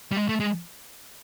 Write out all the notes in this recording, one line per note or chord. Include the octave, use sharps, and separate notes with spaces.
G3
G#3
A3
G#3